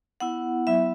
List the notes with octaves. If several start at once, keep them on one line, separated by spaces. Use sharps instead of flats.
B3 E4 F#5
F#3 B3 E4 E5